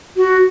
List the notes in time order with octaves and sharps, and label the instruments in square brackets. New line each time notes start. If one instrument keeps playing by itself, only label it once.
[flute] F#4